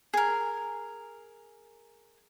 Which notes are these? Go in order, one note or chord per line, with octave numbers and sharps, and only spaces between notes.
G#4 A#4